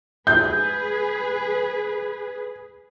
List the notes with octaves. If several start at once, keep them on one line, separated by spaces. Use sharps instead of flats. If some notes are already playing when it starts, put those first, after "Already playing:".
G#4 B4 G6